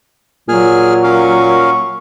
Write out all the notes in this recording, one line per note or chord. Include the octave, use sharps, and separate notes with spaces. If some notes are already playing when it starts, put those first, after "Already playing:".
A#2 F#3 G#4 G#5 F6
C#4 A#4 F5 C#6